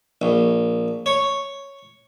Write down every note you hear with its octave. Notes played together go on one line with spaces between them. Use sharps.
A#1
C#5